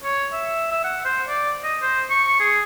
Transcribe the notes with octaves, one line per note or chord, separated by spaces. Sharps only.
C#5
E5
E5
F#5
C5
D5
D#5
C5
C#6
G#4